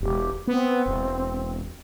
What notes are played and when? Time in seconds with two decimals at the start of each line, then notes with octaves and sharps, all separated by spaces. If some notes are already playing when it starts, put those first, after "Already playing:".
0.01 E1 G4
0.48 B3 C4
0.86 E1